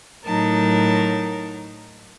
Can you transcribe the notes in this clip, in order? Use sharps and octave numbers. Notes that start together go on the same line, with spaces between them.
A2 F#3 D#4 A#4 A5